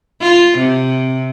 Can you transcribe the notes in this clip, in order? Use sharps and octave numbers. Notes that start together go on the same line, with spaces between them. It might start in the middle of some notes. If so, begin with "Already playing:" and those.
F4
C3